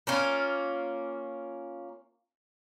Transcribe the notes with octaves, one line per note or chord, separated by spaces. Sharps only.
A#3 C#4 F4